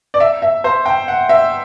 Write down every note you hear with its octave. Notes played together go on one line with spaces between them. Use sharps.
D5
E5
E5
C5
G5
F#5
E5